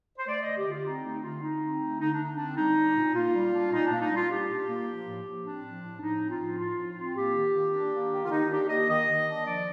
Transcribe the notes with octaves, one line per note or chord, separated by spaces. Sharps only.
C5
A3 D5
D3 D#5
G4
D3
F4
C4 D#4
A3 D#4
D3 F4
D3 D#4
C4
A3
D3 D#4
D4
D3
C4 D4
G3 D#4
D4
A#2
A#3 F4
G3
D4
A#2 D#4
D4
A#3
D#4
G3
F4
D4 G4
A#2
A#3
F3
A2
A2
C4 D4
F3
A2
A2 D#4
C4
F4
F3
A2 F4
A2
C4
A#3 G4
D#3
D#3
D4
A#3
D#3
F4
D#3 D#4
D4 G4
A#3 D#5
D#3 D#5
D#3
D4
F3 D5